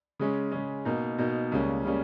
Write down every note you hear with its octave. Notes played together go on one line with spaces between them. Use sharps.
C#3 G#3 C#4
C#3 G#3 C#4
B2 A#3 D#4
B2 A#3 D#4
C#2 C#3 G3 A#3 C#4
C#3 G3 A#3 C#4